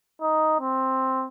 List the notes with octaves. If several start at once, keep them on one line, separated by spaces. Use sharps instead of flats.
D#4
C4